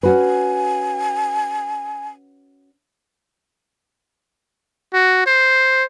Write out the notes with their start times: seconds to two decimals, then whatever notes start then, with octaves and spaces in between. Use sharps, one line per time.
0.03 C#4 F#4 B4 G#5
4.94 F#4
5.27 C5